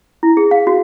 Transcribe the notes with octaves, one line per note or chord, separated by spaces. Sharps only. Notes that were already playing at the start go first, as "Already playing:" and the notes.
E4
G#4
F5
F#4